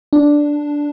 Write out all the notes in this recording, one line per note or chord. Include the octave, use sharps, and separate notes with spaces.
D4